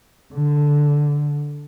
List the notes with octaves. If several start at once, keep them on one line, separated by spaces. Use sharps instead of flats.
D3